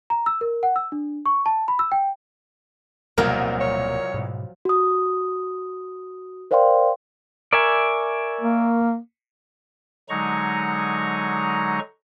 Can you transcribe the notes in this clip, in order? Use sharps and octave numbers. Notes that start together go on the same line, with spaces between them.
A#5
E6
A#4
F#5
E6
D4
C#6
A5
B5
E6
G5
D1 C2 B2 F3 F#3 A#3 F4 A#4
C#5
G#2 B2
F#4 D#6
A#4 C5 D5 F5 G5 C6
A#4 D5 E5 G#5 C#6
A#3
D3 F#3 G#3 D#4 A#5 C#6